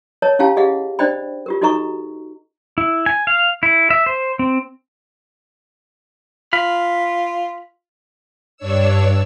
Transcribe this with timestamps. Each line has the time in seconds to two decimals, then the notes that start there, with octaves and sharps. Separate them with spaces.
0.22 A#4 C#5 D#5 A5
0.39 C#4 E4 G4 F5 G5 A5
0.57 G4 G#4 D#5 F5 F#5
0.99 D4 C5 D5 D#5 G5 B5
1.46 F4 G4 A#4
1.61 D#4 F#4 A4 D#5 A#5 C#6
2.78 E4
3.06 G#5
3.27 F5
3.63 E4
3.90 E5
4.06 C5
4.39 C4
6.53 F4 B5 F6
8.57 G2 D4 C#5 E6